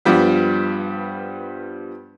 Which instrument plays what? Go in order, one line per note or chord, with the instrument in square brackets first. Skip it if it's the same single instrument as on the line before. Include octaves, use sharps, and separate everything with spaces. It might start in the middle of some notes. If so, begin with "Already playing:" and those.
[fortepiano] G2 F3 G3 B3